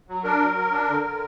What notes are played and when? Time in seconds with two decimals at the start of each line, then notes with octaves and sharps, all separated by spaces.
0.09 F#3
0.24 D4 A#4
0.40 F#3
0.57 F#3
0.72 D4
0.89 D3
1.04 D3